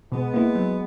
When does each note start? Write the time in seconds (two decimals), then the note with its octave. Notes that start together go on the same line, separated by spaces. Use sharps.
0.12 B2 G#3 B3
0.34 A#3 E4
0.55 F#3